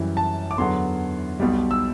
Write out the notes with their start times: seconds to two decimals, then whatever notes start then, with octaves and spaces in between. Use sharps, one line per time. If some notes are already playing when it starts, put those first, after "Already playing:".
Already playing: F#2 E3 G3
0.17 A5
0.51 D6
0.58 E2 D3 F#3 B3 C6
1.40 B1 B2 G3
1.71 E6